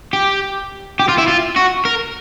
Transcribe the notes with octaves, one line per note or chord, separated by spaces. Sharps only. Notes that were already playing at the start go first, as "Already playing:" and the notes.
G4
G4
F4
E4
F4
F#4
A#4